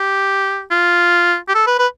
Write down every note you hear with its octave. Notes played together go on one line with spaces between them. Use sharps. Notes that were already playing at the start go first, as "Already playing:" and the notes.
Already playing: G4
F4
G4
A4
B4
B4